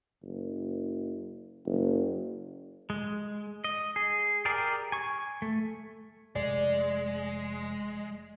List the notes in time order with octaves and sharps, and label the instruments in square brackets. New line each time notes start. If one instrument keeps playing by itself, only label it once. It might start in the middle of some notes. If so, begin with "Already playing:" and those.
[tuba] F#1
F#1
[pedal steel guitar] G#3
D#5
G#4
G4 G#4 A#4 D5
G#5 C#6
A3
[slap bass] F1 [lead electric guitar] G#3 [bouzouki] D5